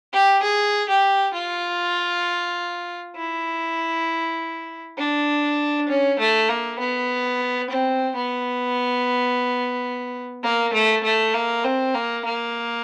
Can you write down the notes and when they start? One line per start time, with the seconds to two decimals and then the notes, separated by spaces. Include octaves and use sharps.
0.13 G4
0.43 G#4
0.89 G4
1.34 F4
3.16 E4
4.98 D4
5.89 C#4
6.19 A3
6.49 A#3
6.80 B3
7.70 C4
8.16 B3
10.43 A#3
10.73 A3
11.04 A3
11.34 A#3
11.64 C4
11.95 A#3
12.25 A#3